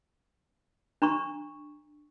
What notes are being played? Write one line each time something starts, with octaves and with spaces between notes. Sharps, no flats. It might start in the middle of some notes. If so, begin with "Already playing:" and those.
D4 A#5 C#6